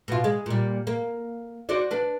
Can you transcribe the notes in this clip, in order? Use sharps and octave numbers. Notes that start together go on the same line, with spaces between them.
B2 F4
G#3
A#2 G3
A#3
F#4 C5 D5
D4 B4